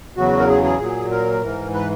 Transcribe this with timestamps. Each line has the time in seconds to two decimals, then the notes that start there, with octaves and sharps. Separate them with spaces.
0.17 E2 C#3 F#3 F#4
0.39 A#4
0.48 G#4
0.64 G#4
0.80 A#2 F#3
1.11 A#4
1.42 G#2 E3
1.74 B4